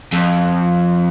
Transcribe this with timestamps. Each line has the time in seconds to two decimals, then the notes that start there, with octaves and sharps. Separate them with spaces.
0.13 F2